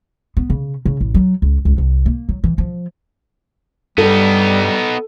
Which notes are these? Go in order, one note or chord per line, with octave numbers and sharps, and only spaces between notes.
B3
C#3
C#3
A1
F#3
C#2
C#2
C2
A#3
F#3
E3
F3
G2 G3 B3 D#4 A4